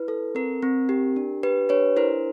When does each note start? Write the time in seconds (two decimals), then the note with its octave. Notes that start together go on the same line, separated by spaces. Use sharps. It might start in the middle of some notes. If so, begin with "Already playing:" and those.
Already playing: E4 B4
0.08 A4
0.35 C4 A#4
0.62 C4
0.89 G4
1.16 D4
1.43 G4 B4
1.69 D4 B4 C#5
1.97 E4 A#4 C5